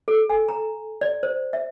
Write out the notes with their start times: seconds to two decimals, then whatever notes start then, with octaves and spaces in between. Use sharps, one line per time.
0.08 A4
0.30 G#5
0.49 A#5
1.01 D5
1.23 C5
1.53 E5